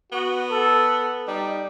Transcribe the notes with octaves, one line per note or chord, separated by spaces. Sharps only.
B3 F#4
A4
G3 D#4